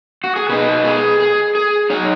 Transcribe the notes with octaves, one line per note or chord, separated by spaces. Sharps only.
F#4
G#4
B2 B3 D#4 B4
G#4
G#4
G#4
F#3 D#4 C#5